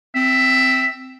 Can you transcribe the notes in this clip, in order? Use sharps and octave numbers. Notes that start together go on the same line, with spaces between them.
C4 E5